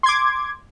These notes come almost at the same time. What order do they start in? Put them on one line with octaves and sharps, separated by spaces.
C6 G#6 D6